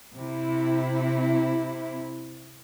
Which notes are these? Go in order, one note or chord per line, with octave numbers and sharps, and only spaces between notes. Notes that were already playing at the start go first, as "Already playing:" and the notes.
C3 E4